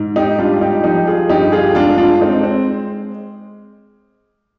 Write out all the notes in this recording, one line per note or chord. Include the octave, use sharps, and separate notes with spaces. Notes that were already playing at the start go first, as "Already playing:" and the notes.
Already playing: G#2
D#4 G4
G3 D4 F4
F4
D#4 G4
F3 D#4 G4
F4 G#4
G2 D#4 G4
F4 G#4
G#3 D4 F4
D4 F4
G#3 C4 D#4
C4